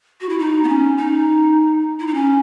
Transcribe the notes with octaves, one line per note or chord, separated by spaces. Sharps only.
F#4
E4
D#4
B3
C#4
D#4
E4
D#4
C#4